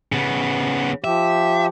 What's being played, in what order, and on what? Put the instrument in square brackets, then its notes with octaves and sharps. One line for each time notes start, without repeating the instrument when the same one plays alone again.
[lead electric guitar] C#3 B3
[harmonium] F3 G4 [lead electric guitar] E5